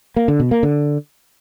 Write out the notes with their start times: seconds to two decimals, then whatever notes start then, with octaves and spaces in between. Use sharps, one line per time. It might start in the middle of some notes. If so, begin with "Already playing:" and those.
0.16 A#3
0.28 D3
0.40 B2
0.51 A#3
0.63 D3